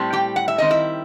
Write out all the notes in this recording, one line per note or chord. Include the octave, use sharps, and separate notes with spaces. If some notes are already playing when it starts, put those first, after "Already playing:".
Already playing: A2 G3 C4
G4 G5
F#5
E5
D#3 G3 C4 D#5
E4 E5